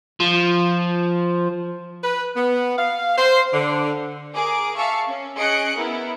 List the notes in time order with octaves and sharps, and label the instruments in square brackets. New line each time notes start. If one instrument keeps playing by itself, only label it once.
[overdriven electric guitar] F3
[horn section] B4
B3
F5
C5
D3
[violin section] G#4 A#4 D6
E5 F5 A5 C#6
C#4
C#4 G#4 D#5 F#6 C#7 D7
B3 E4 A#4